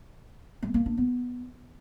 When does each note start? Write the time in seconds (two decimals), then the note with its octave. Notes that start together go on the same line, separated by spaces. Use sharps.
0.63 A3
0.74 A#3
0.86 D4
0.97 B3